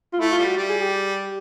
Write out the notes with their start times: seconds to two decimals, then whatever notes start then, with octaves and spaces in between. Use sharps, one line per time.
0.13 F4
0.19 A3 E4
0.32 F4
0.38 G3
0.45 F#4
0.57 G3
0.69 G#4
0.82 G4